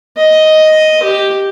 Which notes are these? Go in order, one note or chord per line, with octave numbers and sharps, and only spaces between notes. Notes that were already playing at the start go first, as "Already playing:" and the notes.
D#5
G4